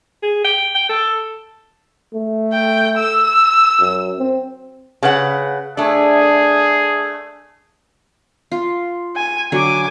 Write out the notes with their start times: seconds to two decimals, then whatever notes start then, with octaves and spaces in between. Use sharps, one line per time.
0.23 G#4
0.44 G5
0.75 G5
0.89 A4
2.14 A3
2.53 G5
2.97 E6
3.80 F#2
4.19 C4
5.03 C#3 B4 F#5
5.77 A3 D4 G#4
8.51 F4
9.16 G#5
9.52 D3 F#3 G#5 D6